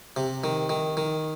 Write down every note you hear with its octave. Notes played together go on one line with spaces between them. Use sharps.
C3
D#3
D#3
D#3